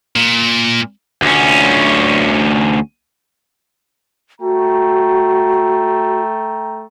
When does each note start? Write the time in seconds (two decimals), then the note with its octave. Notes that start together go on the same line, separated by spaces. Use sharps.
0.16 A#2
1.22 D2 C#4
4.41 A3 F#4 G5 A#5